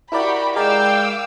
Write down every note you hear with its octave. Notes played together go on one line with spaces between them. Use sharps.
E4 F#4 G4 A#4 D5 B5
G#3 A#4 D5 F5 G5 D6 E6